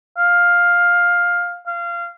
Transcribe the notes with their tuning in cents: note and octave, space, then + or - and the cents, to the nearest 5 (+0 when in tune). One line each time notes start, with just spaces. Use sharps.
F5 +10
F5 -20